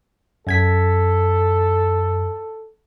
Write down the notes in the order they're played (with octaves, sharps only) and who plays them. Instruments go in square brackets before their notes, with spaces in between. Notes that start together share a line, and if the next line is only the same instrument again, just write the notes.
[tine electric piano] F#2 G#6 B6 [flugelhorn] A4